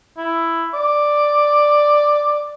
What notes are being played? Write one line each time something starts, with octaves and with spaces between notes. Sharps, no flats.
E4
D5